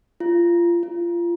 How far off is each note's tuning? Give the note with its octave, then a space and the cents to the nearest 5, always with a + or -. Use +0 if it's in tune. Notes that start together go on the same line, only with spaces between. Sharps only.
F4 -25
F4 -25